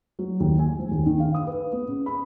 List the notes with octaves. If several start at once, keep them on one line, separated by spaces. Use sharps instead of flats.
F#3
D#2
G#5
F3
D#2
D#3
F5
D#6
B4
B3
C#3
B5